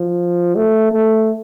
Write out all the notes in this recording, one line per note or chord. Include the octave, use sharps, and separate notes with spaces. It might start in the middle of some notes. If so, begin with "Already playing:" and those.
Already playing: F3
A3
A3